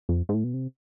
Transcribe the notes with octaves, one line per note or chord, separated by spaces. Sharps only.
F2
G#2
A2
B2
C3